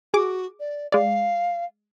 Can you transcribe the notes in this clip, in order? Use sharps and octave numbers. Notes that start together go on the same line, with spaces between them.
F#4 G#4 D6
D5
G#3 D5 F5